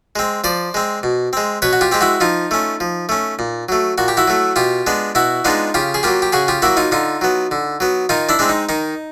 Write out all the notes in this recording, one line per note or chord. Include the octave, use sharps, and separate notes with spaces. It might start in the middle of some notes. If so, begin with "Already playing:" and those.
G#3 C4
F3 C5 D5
G#3 C4
B2
G#3 C4
B2 B4 C#5
F#4
F4 G4
G#3 C4 G4
E4 F#4
F3 D#4 F4
A3 C#4
F3
A3 C#4
A#2
F#3 A3
A#2 F#4
G4
E4 F#4
F#3 A3
B2 F4 G4
G#3 B3 D4
B2 E4 F#4
G#3 B3 D4 D#4 F4
C#3 F4 G4
G#4
F#3 A#3 F4 G4
G4
C#3 F#4 G#4
F4 G4
F#3 A#3 E4 F#4
D#4 F4
D3 D#4 F4
F#3 B3
D3
F#3 B3
D#3 D#4 F4
D4 E4
G#3 C4 D4
D#4
D#3 D#4